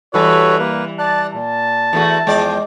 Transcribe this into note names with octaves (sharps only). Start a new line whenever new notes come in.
E3 G3 F#4 A4 B4 C#5
A#3 B4
D5 A5 F#6
A#2 A5
E2 A3 F#4
E2 F3 G#3 D5 G5